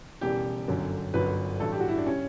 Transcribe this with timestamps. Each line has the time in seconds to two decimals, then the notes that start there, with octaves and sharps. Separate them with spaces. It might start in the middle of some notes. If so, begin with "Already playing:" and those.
0.21 E1 E2 C#3 E3 G3 G4
0.68 G1 F#2 D3 F#3
1.14 G1 F#2 D3 F#3 B4
1.60 A1 G2 F#3 A4
1.72 G4
1.80 F#4
1.89 E4
1.98 D4
2.06 C#3 G3 C#4